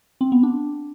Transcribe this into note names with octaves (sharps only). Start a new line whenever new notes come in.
C4
B3
D4